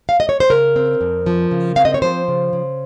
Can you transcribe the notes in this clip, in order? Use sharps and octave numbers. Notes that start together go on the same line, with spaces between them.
F5
D#5
C#5
C5
C#3 A#4
C4
F2
F3
C#3
C4 F5
D#5
C#5
F3 C5
C#3
C#3